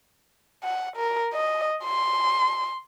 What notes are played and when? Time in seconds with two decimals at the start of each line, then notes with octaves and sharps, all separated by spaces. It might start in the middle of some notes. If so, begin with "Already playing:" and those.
0.63 F#5
0.97 A#4
1.33 D#5
1.84 C6